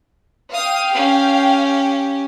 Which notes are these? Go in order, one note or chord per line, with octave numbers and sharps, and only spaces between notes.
F5 G5 D#6
C#4 G4